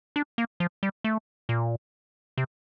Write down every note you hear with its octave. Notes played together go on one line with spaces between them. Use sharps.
D4
A#3
F3
G3
A3
A#2
C3